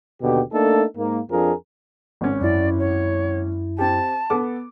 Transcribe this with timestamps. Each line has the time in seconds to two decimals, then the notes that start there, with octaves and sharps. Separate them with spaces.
0.22 D#2 B2 D3 G4
0.53 A3 A#3 D4 D#4 A4
0.97 G#2 A#3
1.31 F2 F3 D4 G#4 A#4
2.21 G#1 C#4
2.41 F#2 E4 D5
2.79 C#5
3.78 C4 G4 A5
4.30 B3 A4 D6